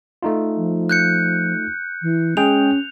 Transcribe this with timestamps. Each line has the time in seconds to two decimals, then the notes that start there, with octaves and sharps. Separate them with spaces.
0.23 A3 D#4 F4
0.57 F3
0.89 F#6 G6 C#7
2.02 E3
2.37 G#3 C#4 G#4 G5 F7